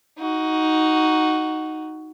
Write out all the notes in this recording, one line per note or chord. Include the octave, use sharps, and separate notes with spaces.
D#4 F#4